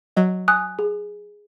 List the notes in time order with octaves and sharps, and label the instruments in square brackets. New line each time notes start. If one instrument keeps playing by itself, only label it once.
[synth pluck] F#3 [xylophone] D#5
[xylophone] G#5 D#6 F#6
G#4